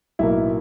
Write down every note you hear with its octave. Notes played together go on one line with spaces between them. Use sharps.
B1 A2 F#3 A#3 E4